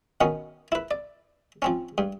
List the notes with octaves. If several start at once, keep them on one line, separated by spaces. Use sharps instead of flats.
B2 D#3 B3 C#4
E4 B4
D5
F3 C4 C#4
G2